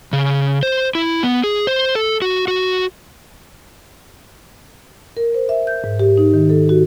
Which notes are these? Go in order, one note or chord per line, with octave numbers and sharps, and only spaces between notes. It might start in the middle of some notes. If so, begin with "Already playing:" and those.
C#3
C5
E4
B3
G#4
C5
A4
F#4
F#4
A#4
C5
E5
G6
G#2
G4
D#4
D#3
A4
F#4